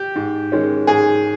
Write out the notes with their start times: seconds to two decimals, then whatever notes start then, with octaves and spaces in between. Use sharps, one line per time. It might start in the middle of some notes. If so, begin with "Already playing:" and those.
Already playing: G4
0.15 G#2
0.52 D#3 G#3 C#4
0.87 G#2 G#4